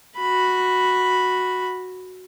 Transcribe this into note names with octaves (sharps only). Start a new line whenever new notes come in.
F#4 B5